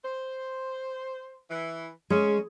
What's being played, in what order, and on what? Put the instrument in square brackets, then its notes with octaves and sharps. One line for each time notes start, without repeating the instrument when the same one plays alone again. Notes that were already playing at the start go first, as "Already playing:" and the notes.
[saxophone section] C5
E3
[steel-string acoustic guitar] G#3 [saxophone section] C#4